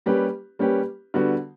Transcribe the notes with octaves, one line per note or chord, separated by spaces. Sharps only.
G3 A#3 C#4 G4 B4
G3 A#3 C#4 G4 B4
D3 G3 B3 F#4